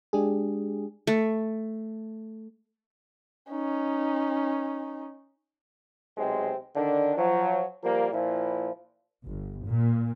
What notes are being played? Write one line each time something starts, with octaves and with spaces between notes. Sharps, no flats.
G#3 D4 G4 G#4
A3
C#4 D#4
B1 C3 G#3 C4
D3 D#3 D4
F3 F#3
F3 G3 A#3
A#2 F3 E4
G1
A#2